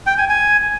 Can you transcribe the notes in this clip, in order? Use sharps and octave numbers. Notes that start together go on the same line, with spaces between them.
G5
G#5
G#5